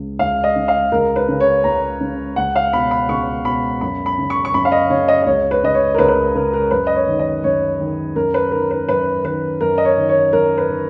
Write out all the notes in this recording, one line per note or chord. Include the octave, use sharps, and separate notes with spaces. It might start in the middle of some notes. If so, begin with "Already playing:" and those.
Already playing: C#2 C#3
C#2 F5
D#5
C#3
F5
C#2 A#4
B4
C#3
C#5
C#2 A#5
C#3
C#2 F#5
F5
B2 B5
B5
C#2 C#6
B2 B5
F#2 B5
B5
C#3
C#6
C#6
F#2 B5
F5
D#5
C#3 C#5
D#5
D#5
C#2 C#5
B4
C#3 D#5
C#5
A#4
C#2 B4
B4
A#4
C#3 A#4
A#4
F#2 B4
D#5
C#5
D#3
D#5
F#2 C#5
D#3
F#2 A#4
B4
D#3 A#4
B4
F#2 B4
D#3 B4
F#2 A#4
D#5
C#5
D#3
C#5
F#2 A#4
B4
D#3